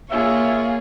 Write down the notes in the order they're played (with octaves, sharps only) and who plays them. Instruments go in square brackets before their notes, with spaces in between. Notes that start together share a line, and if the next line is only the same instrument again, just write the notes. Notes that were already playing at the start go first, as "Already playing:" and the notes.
[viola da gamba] A#3 C#5 [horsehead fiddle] F4 G#4 [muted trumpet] E5